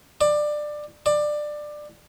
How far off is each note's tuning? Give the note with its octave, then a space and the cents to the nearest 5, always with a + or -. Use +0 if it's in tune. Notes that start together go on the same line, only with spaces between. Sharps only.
D5 +20
D5 +20